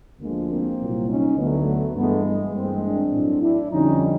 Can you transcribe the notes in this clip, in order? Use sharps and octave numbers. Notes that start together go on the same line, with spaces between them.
D2 D3 F3 G#3 A#3
A#3 C4
C2 A#2 F#3
C#4 D#4
D2 D3 F#3 A3 B3
G2 E3 G#3 A3 B3
A3 B3
G2 E3 G#3 A#3 C4
C4 D4
A2 F#3
D4 E4
F2 D3 G3 C#4 D#4